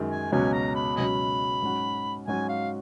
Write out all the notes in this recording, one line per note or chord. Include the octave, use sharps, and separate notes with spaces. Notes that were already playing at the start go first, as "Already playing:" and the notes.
Already playing: F#2 D#3 G#3
G#5
C#2 B2 F#3 C#4 G#5
A#5
B5
C#2 B2 F#3 C#4 D#5 G#5 B5
G#2 F#3 C#4 F#4
G#2 F#3 C#4 F#4 G#5
F5